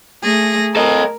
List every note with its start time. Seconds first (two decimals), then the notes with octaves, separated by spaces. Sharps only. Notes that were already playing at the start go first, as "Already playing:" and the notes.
0.22 A3 G#4 A#6
0.76 A4 A#4 D#5